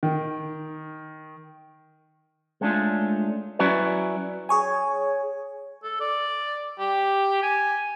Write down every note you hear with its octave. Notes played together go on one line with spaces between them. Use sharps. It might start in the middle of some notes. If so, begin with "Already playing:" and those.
D#3
G#3 A3 C#4 D4 F4
F#3 C#4 E4 F#4 B4 D5
G#4 C#5 G#5
A4
D5
G4
G#5